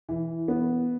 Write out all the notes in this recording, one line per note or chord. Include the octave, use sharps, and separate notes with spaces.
E3
B3